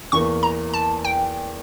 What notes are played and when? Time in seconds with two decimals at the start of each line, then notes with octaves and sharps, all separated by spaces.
0.12 E2 E3 A#3 C#6
0.43 A#5
0.73 A5
1.05 G5